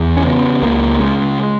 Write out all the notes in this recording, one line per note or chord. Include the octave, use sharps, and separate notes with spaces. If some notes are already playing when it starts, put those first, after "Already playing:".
Already playing: E2
C#4
C#3 B3
C#2 A#3
C#3 G#3